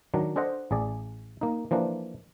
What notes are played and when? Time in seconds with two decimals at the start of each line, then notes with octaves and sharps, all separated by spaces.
0.14 D#3 F#3 D4
0.36 D4 A4 C5 D#5 F#5
0.71 A1 G#4 D5
1.41 A#3 D#4
1.71 E3 F3 A#3 D4